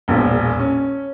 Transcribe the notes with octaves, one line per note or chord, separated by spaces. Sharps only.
E1 A#1 A#2
C#4